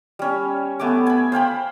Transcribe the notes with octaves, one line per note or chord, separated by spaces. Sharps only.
G3 C#4
A3 B3 G#5 D6
G#5 B5
C5 F5 G5 B5